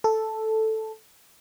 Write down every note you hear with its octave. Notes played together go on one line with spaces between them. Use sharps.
A4